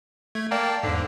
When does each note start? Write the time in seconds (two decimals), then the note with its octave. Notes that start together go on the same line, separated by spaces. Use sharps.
0.35 A3 G#6
0.51 A#3 D5 G5 A5
0.83 E2 G#2 D3